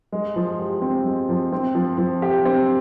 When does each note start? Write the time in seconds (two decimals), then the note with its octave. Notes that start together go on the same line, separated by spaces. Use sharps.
0.12 G#3
0.36 F3
0.59 G4
0.82 C4
1.05 G#3
1.29 F3
1.52 C4
1.75 F3
1.98 F3
2.22 G4
2.45 C4